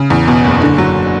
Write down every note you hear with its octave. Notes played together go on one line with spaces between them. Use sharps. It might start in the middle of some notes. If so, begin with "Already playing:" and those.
Already playing: C#3
E2
B2
F#1
D3
F#3